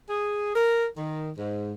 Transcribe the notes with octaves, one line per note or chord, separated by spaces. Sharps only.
G#4
A#4
D#3
G#2